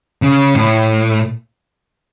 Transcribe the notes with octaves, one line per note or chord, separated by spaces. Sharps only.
C#3
A2